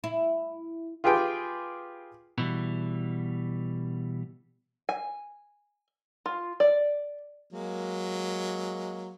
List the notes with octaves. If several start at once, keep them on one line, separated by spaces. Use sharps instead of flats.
E4
F4 G4 G#4 B4 G5
B2 E3 G3
G#5
F4
D5
F#3 G#3 A#3